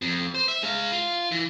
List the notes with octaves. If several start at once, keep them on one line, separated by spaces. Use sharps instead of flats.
F2
C5
E5
G#3 F5
F4
E3